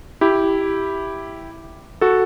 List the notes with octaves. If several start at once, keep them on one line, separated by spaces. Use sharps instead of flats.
E4 G4
F#4 A4